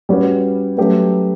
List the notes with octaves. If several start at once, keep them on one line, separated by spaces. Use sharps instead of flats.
G3 C#4 F#4 B4
F#3 A3 C#4 G4 B4